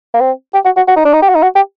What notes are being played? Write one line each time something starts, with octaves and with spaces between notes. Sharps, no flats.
A#3
C4
G4
F#4
F#4
F#4
D#4
D4
D#4
G4
F#4
D#4
F#4
G4